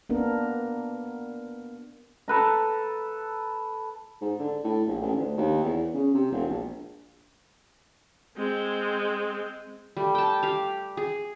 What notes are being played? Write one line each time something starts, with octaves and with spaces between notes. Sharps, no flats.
A#3 B3 D4 A#4
A4 B4 A#5
G#2
D3
A2
A#1
A1
D2
D#2
E2
C#3
C3
E1
A#1
G#3 C4
G3 A3
G5 A5
G4 F5
G#4